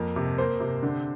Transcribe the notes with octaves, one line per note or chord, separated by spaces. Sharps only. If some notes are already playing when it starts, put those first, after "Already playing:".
Already playing: F2 A#3
C3
A#3 C5
C3
D3